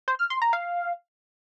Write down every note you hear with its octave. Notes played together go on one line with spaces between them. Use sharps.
C5
F6
C6
A#5
F5